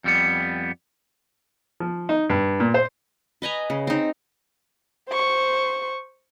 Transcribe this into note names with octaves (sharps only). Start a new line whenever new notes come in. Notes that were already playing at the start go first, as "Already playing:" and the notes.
F2 G3 B3
F3
D#4
G2
A#2
C5
B4 D#5 G#5 A#5
C#3
C4 D#4
C5 C#6